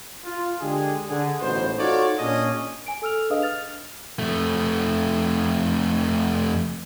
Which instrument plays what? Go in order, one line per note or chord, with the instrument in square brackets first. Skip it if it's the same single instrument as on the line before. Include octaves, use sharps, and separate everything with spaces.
[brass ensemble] F4
D3 G#3 D4 G4 G#4
D3 G#4
A1 G#2 B2 C5
D#4 F4 F#4 A4 C#5 D5
A#2 C#4 D4 F4 G#4 D#5
[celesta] G#5 D7
A4 E6 F6 F7
D4 G#4 B4 D#5 F5 D#6
F6 A6 F7
[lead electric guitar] F2 A3